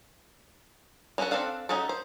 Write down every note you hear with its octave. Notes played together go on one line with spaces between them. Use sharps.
G3 C#4 F#4 A4 F#5
C4 D4 A4 F5 F#5
C#4 D#4 F#4 G#4 A4
C5